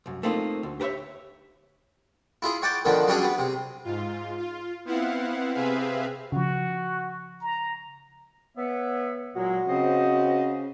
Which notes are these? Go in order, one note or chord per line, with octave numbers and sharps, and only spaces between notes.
C2 F#2
A3 A#3 C4 D#4 F4
D2
G4 A#4 B4 C#5 E5
E4 F4 G#4
C#5 F#5 G5 A5 D6
D3 D#3 F3 B3
F#3 G3 C#4 D4 G4 G#4
B3
C3
G#2 F4
F4
B3 C4 E4 F5 F#5
C3 C4 G#4 B4 E5 F5
C#3 F3 F#4
A#5
B3 C#5 E5
A#2 F#3 G#3 F#4
C#3 C4 C5 D#5